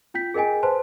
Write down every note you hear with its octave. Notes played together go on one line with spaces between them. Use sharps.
F4 G5 G6 B6
G#4 A#4 D#5 G5 G#5
B4 C5 A5 C6